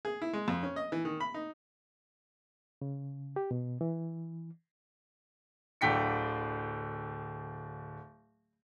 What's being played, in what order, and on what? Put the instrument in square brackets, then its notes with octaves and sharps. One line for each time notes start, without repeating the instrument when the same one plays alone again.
[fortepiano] G#4
E4
G#3
F2
C#4
D#5
E3
D#3
B5
D#4
[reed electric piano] C#3
G4
B2
E3
[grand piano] D1 D3 G5 B6 C#7